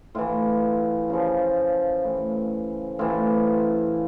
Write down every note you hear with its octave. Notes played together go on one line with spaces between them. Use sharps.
A2 E3 F4
C#3 F3
A2 E3
A2 E3 F4